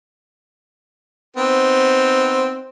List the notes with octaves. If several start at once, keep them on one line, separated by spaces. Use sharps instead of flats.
B3 C4 D#4